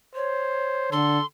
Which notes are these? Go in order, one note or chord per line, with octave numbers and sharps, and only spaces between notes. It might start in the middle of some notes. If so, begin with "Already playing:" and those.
C5 C#5
D3 A4 C6